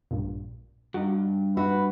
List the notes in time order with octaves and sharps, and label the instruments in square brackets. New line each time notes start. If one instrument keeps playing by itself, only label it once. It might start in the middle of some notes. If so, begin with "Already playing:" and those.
[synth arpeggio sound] A#1 G2 A#2
[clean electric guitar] G2 [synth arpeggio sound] D#4 F#4
[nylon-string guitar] F#4 [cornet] B4 [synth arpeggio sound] E5